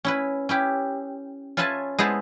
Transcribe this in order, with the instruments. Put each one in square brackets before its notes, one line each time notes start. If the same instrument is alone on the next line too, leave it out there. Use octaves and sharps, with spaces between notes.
[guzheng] C#4 E4 B4
C#4 E4 G4
C#4 F4 B4 E5 G#5 A5
G#3 B3 E4 C5 A5